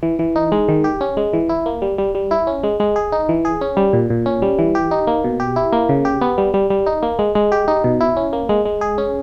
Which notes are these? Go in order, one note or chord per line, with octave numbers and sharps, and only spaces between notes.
E3
E3
D#4
G#3
D#3
G4
C#4
G#3
E3
E4
A#3
G3
G3
G3
E4
C#4
G#3
G#3
G#4
D#4
E3
G#4
C#4
G3
A#2
A#2
C#4
G3
E3
G4
D#4
A#3
B2
G4
E4
A#3
C#3
G4
B3
G3
G3
G3
D#4
A#3
G#3
G#3
G4
D#4
B2
E4
C#4
A#3
G#3
G#3
G#4
C#4